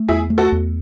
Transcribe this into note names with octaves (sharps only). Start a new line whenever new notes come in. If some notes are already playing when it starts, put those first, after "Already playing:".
Already playing: A3
E2 E4 G#4
A3
F#4 A4
E2